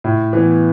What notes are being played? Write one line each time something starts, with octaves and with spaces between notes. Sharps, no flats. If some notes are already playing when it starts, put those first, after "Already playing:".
A2
E3 B3